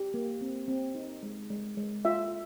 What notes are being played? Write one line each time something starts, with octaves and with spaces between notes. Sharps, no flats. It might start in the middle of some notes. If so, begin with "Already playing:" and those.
Already playing: G4
A#3
C4
C4
D#4
G#3
G#3
G#3
F4 E5